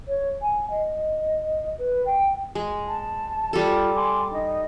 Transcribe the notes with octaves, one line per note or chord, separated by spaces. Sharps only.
C#5
G#5
D#5
B4
G5
G#3
A5
G3 F4 A4
G#5 C6 D6
D#4 D#5